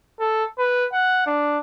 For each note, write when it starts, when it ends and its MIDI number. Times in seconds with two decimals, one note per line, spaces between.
0.20 0.44 69
0.58 0.86 71
0.93 1.26 78
1.26 1.59 62